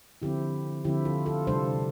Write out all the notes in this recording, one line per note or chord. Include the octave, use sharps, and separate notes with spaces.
D3 F3 C4 E4 G4
D3 F3 C4 E4 G4
F4 A4
F4 A4
C3 G3 D4 A4 C5